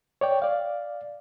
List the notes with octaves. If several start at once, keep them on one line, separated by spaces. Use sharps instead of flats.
C#5 D5 G5
D5 F5